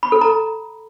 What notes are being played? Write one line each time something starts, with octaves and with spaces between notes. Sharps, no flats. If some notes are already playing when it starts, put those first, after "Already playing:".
B5
A4
A#5